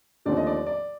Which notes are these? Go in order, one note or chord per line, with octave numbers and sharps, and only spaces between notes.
D#2 D3 F3 A3 C4 D5
D#5
D5
D5